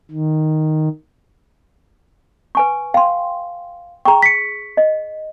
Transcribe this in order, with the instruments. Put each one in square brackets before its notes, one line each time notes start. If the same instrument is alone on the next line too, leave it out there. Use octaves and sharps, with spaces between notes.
[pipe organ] D#3
[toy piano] B4 G#5 C#6
[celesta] F5 [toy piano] G5 C6
[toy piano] G#4 C#6 [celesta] G5 A#5
[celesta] B6 C#7
[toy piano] D#5